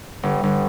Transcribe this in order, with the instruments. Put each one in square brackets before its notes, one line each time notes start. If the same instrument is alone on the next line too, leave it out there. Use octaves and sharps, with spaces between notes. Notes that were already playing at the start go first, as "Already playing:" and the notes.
[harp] G1
G1